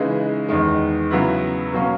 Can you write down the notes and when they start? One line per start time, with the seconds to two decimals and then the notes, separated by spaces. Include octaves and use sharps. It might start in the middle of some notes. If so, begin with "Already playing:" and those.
Already playing: C#3 E3 G#3 D#4
0.48 E2 D#3 G#3
1.11 C#3 F#3 B3 E4
1.73 B2 F#3 A#3 C#4